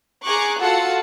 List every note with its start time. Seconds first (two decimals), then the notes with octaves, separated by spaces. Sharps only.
0.25 G#4 A#5 C#6 D6 F#6
0.60 F4 F#4 A4 F#5 A5 C#7